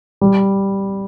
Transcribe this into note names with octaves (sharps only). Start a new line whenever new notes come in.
G3